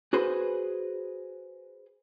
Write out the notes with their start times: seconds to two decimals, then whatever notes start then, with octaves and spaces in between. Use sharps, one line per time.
0.13 F#4 G#4 B4 C5